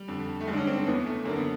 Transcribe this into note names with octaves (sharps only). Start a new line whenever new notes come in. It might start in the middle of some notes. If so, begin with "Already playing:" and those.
Already playing: G3
F2 D3
A3
G2 D3 G#3
D4
C#4
C4
C4
E2 C#3 E3 B3
A3
F#2 D3 A#3
B3